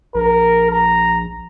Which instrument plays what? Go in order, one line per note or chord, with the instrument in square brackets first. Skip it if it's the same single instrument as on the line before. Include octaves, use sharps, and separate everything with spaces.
[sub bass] A#1 [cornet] A#4
[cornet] A#5